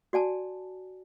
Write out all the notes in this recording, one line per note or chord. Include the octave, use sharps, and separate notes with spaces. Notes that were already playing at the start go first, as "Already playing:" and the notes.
F#4 D5 G#5 A5